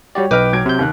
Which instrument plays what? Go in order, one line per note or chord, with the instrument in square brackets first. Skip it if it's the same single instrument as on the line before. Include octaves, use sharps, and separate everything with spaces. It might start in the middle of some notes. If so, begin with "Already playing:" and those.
[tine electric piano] G3 F#4 D5 [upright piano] G4 C#5
[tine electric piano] B1 G5 D6 [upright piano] B4 D#5 F6
[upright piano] F#3 G#6 D7
[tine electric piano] C3 G6
[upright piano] D#2 F#6